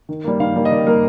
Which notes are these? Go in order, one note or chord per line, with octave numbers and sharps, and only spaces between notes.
D#3
G3 A#3
D#3 F5
G3 A#3
D#5
D#3 D5
G3 A#3 A#4